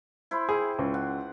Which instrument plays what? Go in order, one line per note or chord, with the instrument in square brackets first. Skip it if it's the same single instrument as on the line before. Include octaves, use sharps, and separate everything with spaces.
[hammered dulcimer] E4 C5 B5
[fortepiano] G#4 [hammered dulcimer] G5
[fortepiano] C#2
[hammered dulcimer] F#5